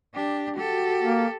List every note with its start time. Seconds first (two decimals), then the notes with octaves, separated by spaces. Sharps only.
0.15 D4 G4
0.57 F#4 G4 A4
1.02 A#3